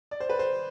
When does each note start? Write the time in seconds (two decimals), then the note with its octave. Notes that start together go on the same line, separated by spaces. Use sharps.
0.11 D5
0.20 C5
0.30 B4
0.39 C5